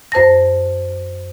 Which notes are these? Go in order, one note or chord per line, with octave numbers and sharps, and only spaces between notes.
F#2 C5 A5 A#6